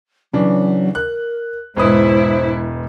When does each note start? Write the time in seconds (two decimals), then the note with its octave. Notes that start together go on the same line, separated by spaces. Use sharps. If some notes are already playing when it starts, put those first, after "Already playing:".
0.34 C#3 E3 F#3 D4
0.95 A#4 F#6
1.76 E1 G#2 E4 B4 C5 D#6